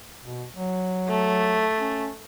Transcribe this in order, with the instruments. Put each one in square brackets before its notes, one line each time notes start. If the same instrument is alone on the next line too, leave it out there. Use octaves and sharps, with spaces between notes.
[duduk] B2
F#3
[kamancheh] A3
[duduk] C#4